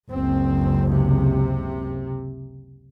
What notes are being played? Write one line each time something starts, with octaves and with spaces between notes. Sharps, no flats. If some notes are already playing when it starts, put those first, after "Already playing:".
F#1 C#2 C4
C3